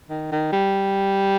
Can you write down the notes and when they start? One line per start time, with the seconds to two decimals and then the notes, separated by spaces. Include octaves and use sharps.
0.10 D#3
0.32 D#3
0.53 G3